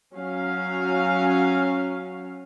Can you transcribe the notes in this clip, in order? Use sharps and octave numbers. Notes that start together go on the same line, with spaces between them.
F#3 C#4 F5